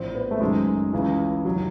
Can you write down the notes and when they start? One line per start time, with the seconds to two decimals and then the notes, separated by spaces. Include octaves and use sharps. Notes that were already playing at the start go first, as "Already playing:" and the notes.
Already playing: A#1 A2 F3 C4
0.15 B3
0.31 A3
0.41 F#1 F#2 D#3 F#3 G#3
0.93 C#2 C#3 E3
1.45 F1 D#3 F#3